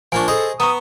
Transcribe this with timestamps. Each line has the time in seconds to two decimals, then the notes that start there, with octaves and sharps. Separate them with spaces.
0.12 F3 A#3 D4 G#5 C#6
0.28 G#4 A4 C5 D#5 B5
0.60 B3 A#5 B5 C#6 D#6